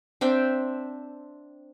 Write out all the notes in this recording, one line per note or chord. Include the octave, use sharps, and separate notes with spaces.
C4 D4 E5 G5